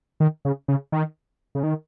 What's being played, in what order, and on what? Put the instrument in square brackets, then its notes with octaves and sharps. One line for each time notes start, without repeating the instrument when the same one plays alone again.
[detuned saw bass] D#3
C#3
C#3
D#3
C#3
D#3